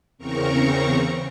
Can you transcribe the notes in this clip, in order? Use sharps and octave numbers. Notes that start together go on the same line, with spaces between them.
E2 C#3 C4 A#4 A#5 C#6